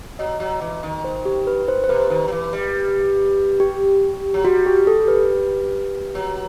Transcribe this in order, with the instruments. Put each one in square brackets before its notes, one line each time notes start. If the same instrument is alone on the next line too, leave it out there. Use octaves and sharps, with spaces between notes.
[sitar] F#3 [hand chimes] D#5
[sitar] F#3
E3
D#3
[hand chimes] C5
G4
B4
C5
C5
[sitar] C3 [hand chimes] B4
[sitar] D#3
F#3
E3
G3
[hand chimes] G4
[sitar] F#3
[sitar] G3 [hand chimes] F#4
[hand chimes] G4
A4
B4
[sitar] F#3